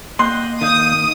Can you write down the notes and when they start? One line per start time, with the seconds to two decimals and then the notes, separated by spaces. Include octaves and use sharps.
0.19 A#3 D#5 F#5 G5 C6
0.61 D#3 F5 D#6 G6